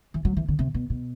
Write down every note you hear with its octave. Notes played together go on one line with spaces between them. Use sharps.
E3
F#3
E3
D3
C3
B2
B2